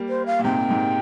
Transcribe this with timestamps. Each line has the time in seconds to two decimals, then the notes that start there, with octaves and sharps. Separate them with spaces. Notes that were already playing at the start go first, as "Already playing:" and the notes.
Already playing: G3 A#3
0.09 C5
0.26 F5
0.39 A#2
0.44 G#2 C3 G5
0.70 G#2